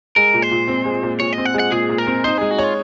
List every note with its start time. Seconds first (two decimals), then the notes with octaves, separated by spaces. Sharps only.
0.16 G#3 A#4
0.34 A#2
0.42 C5
0.51 A#2
0.68 C4
0.85 G#3
1.03 A#2
1.20 A#2 C#5
1.33 D#5
1.38 C4
1.46 F#5
1.54 G#3
1.59 F#5
1.72 A#2 G#4
1.89 A#2
1.98 A#4
2.07 C4
2.24 D#4 C5
2.38 G#3 G#4
2.51 F#4
2.59 F4 C#5